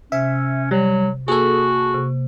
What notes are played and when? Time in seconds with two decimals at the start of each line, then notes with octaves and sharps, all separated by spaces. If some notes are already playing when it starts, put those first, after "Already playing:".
0.12 C3 C#4 E5
0.71 F#3 G3
1.28 A#3 F#4 G#4 A4
1.95 C3